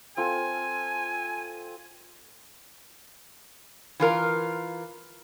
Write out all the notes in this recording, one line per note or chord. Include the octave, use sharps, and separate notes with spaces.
C4 F4 A4 G#5
E3 F4 A#4